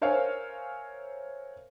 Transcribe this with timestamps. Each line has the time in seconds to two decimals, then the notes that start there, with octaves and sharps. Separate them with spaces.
0.01 A#4 C5 C#5 E5 F5 G#5